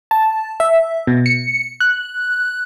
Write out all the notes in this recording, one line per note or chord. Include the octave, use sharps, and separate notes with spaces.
A5
E5
B2
C#7
F#6